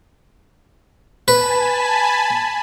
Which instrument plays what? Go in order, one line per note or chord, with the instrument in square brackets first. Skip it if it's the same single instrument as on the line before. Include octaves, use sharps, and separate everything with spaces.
[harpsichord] B4 [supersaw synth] G#5 A5 B5